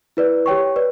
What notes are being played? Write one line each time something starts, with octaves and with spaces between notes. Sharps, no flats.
E4 B4 D5
G4 C#5 G5 C#6
B4 D5